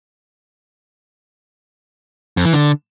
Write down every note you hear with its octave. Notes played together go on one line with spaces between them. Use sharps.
F2
E3
D3